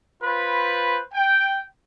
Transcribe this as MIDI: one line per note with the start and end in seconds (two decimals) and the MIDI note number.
0.23 1.00 65
0.23 1.00 71
0.23 1.00 72
0.23 1.00 83
1.13 1.59 79